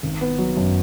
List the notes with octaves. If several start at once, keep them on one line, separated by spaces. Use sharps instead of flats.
G#1
B3
F#3
F#2